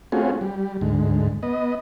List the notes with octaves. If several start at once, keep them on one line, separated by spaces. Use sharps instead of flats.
A3 C4 C#4 F4 F#4 G#4
G3
D2 G#2
B3 D#5